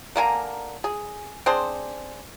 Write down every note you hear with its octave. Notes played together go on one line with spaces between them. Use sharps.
D3 A#3 G#5 A#5
G#4
C4 D4 G#4 C5